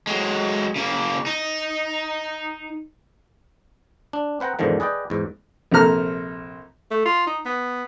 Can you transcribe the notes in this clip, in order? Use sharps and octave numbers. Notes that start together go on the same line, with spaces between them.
F#3 G#3
C#3 A#3
D#4
D4
C4 B4 F#5 G5 A#5
E2 G#2 B2 D3 D#3 F3
G#4 B4 D5 D#5 G5
E2 G#2
A#1 C3 A4 A#5 F6
A3
F4
D#4
B3